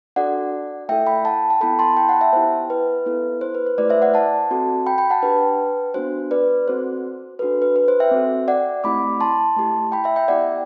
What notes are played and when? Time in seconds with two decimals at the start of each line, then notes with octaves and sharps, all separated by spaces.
0.16 D4 F#4 A4 D5 F#5
0.89 A3 E4 A4 E5 G5
1.06 G5 B5
1.25 F#5 A5
1.50 A5
1.61 B3 E4 A4 G5 B5
1.79 A5 C6
1.97 G5 B5
2.09 F#5 A5
2.21 E5 G5
2.33 B3 E4 G4 C5
2.70 B4
3.06 B3 E4 A4
3.41 C5
3.54 B4
3.66 C5
3.78 A3 E4 G4 B4 D5
3.89 C5 E5
4.02 D5 F#5
4.14 F#5 A5
4.51 C4 F#4 A4
4.86 G5 B5
4.98 G5 B5
5.10 F#5 A5
5.22 D4 G4 B4
5.94 B3 D4 F#4 C5
6.31 B4 D5
6.67 C4 F#4 A4 C5
7.39 D4 F#4 A4 B4
7.62 B4
7.76 B4
7.88 C5
8.00 E5 G5
8.11 C4 F#4 A4
8.48 D5 F#5
8.84 A3 C4 E4 G4 B5 D6
9.21 A5 C6
9.56 A3 E4 G4
9.92 G5 B5
10.04 E5 G5
10.16 E5 G5
10.28 B3 E4 G4 D5 F#5